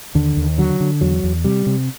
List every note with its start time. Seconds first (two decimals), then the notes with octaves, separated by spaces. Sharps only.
0.15 D#2 D3
0.37 D#2
0.58 D3 F#3
0.80 D3
1.01 E2 F#3
1.24 E2
1.44 C3 G3
1.67 C3